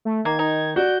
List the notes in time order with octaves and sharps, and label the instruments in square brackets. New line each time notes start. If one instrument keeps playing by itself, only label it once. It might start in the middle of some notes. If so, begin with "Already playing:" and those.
[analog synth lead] A3
[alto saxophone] D#3 [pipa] A#3 [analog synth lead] G#6
[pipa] D#4
[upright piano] F#4 [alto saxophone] D5 [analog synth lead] G6